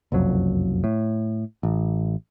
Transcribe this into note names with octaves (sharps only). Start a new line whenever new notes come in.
F#1 C2 F2 F#3
A2
A1